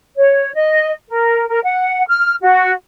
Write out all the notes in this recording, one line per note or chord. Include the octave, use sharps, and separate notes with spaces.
C#5
D#5
A#4
A#4
F#5
F6
F#4